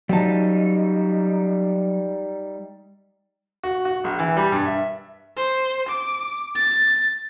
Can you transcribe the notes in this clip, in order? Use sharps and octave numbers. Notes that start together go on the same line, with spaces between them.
F#3 G3 D#4 A5
F#4
F#4
A#1
E3
G3
G2
E5
C5
D6
A6